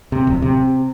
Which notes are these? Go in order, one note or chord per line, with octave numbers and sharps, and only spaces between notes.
C3
D1
C3